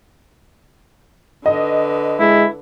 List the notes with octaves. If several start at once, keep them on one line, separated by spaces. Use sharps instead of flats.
D3 B4 D#5
G#3 E4